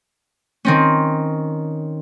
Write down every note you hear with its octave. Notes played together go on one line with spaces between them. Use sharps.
D#3 C4 C#4